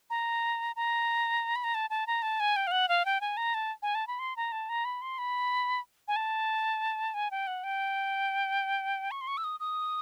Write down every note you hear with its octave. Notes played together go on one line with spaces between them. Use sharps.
A#5
A#5
B5
A#5
A5
A5
A#5
A5
G#5
G5
F5
F#5
F5
G5
G#5
A#5
A5
G#5
A5
B5
C6
A#5
A5
A#5
B5
C6
B5
G#5
A5
G#5
G5
F#5
G5
C#6
C6
C#6
E6
D#6
D#6